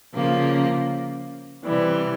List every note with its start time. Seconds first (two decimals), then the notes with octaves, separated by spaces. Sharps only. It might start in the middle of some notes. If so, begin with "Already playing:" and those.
0.14 C#3 F3 A#3
1.64 C3 E3 G3